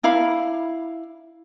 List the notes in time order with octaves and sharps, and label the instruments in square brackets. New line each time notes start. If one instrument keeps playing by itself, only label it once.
[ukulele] D4 E4 F5 B5